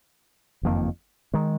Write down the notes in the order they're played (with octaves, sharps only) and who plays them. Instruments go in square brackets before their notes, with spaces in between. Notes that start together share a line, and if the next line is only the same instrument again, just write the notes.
[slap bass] F#1 F2 D#3 A#3
D#3 G#3